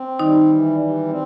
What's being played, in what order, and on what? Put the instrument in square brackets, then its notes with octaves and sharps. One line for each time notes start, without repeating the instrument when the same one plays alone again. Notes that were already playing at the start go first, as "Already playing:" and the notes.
Already playing: [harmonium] C4
[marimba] D#3 D#4 [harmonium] G3
[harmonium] E3
G3
C4